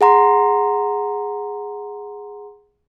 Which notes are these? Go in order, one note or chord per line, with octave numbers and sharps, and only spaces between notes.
G#4 F#5 A#5 C6